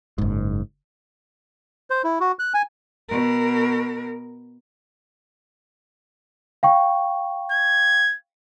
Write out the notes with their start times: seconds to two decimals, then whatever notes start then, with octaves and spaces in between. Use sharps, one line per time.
0.18 F#1 G#2
1.90 C5
2.04 E4
2.20 F#4
2.39 F#6
2.54 G#5
3.09 B2 A#4
6.63 F5 G5 C#6
7.52 G#6